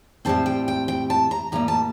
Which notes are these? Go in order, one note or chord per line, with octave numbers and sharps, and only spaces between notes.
A2 G3 C4 A5
G5
G5
G5
A5
A#5
A2 G3 A#3 A#5
A5